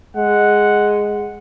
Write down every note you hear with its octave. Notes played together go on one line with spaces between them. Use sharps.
G#3 F#5